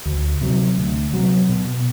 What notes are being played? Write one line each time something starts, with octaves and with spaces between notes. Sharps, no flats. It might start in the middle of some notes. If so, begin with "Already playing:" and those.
D2
C3 F#3
D2
C3 F#3
B2